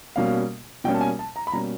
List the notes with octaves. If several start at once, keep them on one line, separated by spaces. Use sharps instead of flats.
B2 G3 A#3 C#4 F5
B2 G3 A#3 C#4 G5
A5
G#5
A5
A#5
B5
B2 G3 A#3 C#4 A#5